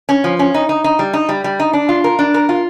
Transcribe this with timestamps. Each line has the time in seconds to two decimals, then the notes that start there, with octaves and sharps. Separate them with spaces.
0.09 C#4
0.24 F3
0.39 C#4
0.54 D#4
0.69 D#4
0.84 D#4
0.99 G3
1.13 D#4
1.29 G3
1.44 G3
1.60 D#4
1.73 D4
1.89 F4
2.04 A#4
2.19 D4
2.34 A#4
2.49 F4